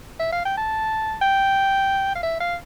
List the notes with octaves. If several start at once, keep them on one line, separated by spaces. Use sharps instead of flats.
E5
F5
G5
A5
G5
F5
E5
F5